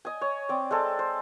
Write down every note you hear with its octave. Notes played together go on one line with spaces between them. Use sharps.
D#5 G#5
C#5
C4 D5
G#3 C4 A4
C5